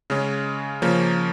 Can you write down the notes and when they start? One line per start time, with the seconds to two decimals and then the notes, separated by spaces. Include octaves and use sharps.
0.10 C#3 G#3 C#4
0.82 C#3 F3 A#3 C#4